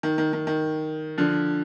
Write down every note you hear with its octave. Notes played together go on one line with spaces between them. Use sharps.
D#3
D#3
D#3
D#3
D3 F3